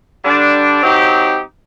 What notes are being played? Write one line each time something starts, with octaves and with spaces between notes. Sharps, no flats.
D3 G3 D4
F#3 C4 D#4 G4